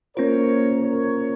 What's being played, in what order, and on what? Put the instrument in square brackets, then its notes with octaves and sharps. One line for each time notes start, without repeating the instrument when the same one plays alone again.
[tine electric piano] A#3 C#4 F4 C5 [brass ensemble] A#4 C#5
[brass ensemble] A#4 C#5